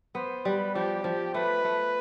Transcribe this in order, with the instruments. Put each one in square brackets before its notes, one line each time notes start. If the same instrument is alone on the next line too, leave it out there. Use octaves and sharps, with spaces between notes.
[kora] B3 [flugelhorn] C5
[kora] G3 [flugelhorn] B4
[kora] F3 [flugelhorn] G4
[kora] F3
[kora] A3 [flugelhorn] B4
[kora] A3